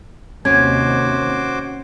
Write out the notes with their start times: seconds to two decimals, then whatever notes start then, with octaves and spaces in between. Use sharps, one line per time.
0.45 D#2 C3 C#4 F#4 C5 D6 G#6